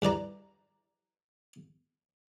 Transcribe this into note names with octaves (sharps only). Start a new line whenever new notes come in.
G2 E3 D5 A#5